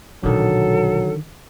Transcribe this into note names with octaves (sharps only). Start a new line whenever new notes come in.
A#1 B2 D3 D#3 F#3 A4